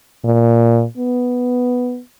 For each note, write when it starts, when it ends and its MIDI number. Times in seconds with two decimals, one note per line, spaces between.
0.24 0.85 46
0.97 2.00 59